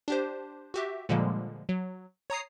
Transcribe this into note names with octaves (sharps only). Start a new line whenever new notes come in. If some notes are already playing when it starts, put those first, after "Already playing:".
D4 G4 C5
F#4 G4 E5
A#2 D3 F3 G3 G#3 A#3
F#3
C#5 A#5 D#6 C7